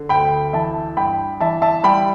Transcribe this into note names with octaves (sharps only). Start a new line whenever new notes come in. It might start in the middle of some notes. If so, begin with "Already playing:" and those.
Already playing: D3
D2 G5 B5
E3 E5 A5
G2 G5 B5
E3 E5 A5
E5 A5
G3 G5 B5